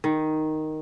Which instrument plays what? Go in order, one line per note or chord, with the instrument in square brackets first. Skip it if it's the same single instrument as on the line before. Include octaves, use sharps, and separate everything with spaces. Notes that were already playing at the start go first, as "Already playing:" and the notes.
[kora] D#3